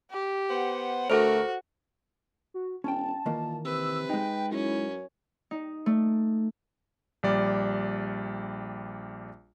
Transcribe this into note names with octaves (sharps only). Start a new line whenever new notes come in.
G4
B3 C5 F#5
D2 A3 F#4 A4 A#4 C5
F#4
E1 C#4 G5 A5
A#2 D#3 E3 A#3
C3 B4 E6
G#3 D#4 G5
F#2 C#4 E4
D#4
A3
A#1 G3 D5